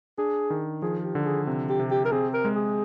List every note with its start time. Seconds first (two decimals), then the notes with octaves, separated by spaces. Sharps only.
0.18 D4 G#4
0.50 D#3
0.82 F3 G#4
1.04 G4
1.15 D3
1.25 G#4
1.47 C3
1.69 G4
1.80 C3
1.91 G4
2.05 A#4
2.12 C4 G#4
2.34 A#4
2.45 G#3
2.55 G#4